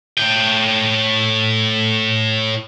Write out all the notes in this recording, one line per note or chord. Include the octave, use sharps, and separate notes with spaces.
A2 G5